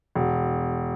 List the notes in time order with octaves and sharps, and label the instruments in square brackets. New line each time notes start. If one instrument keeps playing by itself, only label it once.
[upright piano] E1